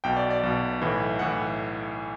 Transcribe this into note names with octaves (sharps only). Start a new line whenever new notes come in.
B1 B2 G5
D5
D5
B1 B2
B1 A2 E3
A2 E3 F#5